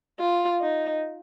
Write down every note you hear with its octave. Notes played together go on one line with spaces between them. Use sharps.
F4
D#4